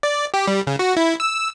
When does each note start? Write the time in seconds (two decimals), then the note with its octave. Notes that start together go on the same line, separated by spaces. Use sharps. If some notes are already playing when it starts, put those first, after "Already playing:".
0.03 D5
0.34 G4
0.47 G3
0.67 C#3
0.79 F#4
0.97 E4
1.20 E6